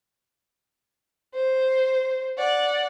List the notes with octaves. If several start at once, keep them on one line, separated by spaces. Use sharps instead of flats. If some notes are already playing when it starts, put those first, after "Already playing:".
C5
D5 F#5